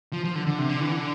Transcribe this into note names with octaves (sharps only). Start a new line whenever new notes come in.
F3
F3
D3
D3
C3
D3
E3
D3